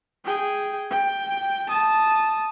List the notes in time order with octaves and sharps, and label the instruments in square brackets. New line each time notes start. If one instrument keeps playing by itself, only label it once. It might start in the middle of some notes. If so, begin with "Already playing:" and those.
[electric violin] G#4 G5
G5
A5 D#6